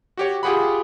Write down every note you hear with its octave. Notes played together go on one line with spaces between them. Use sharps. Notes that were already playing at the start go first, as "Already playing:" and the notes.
F#4 G4 C#5
F4 G4 G#4 F#5 B5